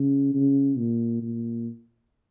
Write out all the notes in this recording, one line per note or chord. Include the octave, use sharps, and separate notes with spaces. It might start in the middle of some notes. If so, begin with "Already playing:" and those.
Already playing: C#3
C#3
A#2
A#2